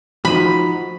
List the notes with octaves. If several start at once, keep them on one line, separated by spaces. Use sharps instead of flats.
F3 D#4 F#4 B5